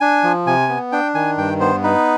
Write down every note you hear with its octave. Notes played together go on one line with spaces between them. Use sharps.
D4 G#5
F3
C3 G#5
B3
D4 G5
D#3 G#5
G2 G5
B3 C5
D#4 B4